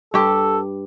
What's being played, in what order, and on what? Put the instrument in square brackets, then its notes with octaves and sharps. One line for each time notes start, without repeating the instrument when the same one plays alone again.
[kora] G2 G4 [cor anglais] A4